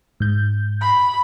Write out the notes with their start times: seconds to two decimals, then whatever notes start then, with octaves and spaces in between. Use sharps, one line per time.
0.20 G#2 G6
0.81 B5